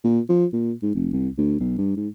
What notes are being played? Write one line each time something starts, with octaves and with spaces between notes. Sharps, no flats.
A#2
F3
A#2
G#2
F1
C2
D2
B1
G2
G#2